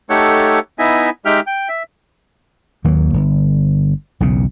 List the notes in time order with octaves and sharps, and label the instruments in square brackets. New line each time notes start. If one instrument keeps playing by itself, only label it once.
[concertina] A3 D#4 G4 A4 C#5 F#5
B3 D#4 E4 D#5 E5 G#5
G#3 D#4 G4 E5 G5 F6
G5
E5
[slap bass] D#2 D#3 F#3 A#3
G1
B1 E2 C#3